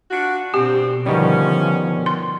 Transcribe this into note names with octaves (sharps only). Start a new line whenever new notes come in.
D4 F4 F#4
G2 B2 D3 C4 G4
B2 D3 D#3 F3 G3 C#4
C6